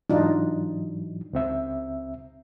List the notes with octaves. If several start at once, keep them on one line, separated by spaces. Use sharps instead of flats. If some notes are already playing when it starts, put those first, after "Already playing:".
G#2 E3 F#3 D4 D#4 F4
C#2 C4 E5